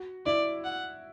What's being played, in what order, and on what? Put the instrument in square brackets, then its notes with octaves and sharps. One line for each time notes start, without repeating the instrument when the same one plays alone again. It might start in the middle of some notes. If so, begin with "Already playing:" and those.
Already playing: [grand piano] F#4
[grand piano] E4 [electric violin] D5
[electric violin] F#5